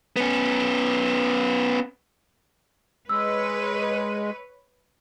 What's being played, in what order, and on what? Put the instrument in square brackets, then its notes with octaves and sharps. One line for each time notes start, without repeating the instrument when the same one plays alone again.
[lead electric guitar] B3 C#4
[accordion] G#3 [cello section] B4 C#5 [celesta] E6